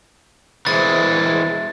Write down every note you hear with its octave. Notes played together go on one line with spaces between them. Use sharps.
E3 G#3 G#4 C5 E5 A6
G#4 E5